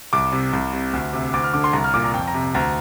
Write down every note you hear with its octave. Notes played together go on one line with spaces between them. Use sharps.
C2 D6
C3
C2
C3
D2
C3
D2 D6
F6
D3 D6
C6
C2 A#5
F6
A#2 D6
A#5
F2 G5
A#5
C3
D2 A#5